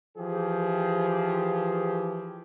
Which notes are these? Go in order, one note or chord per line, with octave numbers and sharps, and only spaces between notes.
E3 F3 G4 G#4